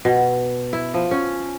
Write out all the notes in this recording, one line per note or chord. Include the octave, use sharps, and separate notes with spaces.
B2
E4
F3
C#4